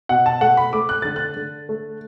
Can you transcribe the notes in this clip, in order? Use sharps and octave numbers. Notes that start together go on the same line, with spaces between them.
B2 F#5
A5
A3 F#5
B5
A3 D6
F#6
D3 A6
F#6
D3
A3